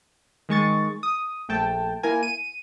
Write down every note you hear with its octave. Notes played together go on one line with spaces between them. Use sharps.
D#3 G#3 C#6 A6
D#6
A#1 A3 G5 A5
A#3 E4 A#4 G#5
D#7